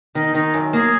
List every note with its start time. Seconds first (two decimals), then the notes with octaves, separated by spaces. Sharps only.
0.15 D#3 D#4
0.35 D#3 D#4
0.54 F#2
0.73 A#3 G#4